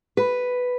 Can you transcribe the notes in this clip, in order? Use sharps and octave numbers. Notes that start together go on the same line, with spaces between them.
B4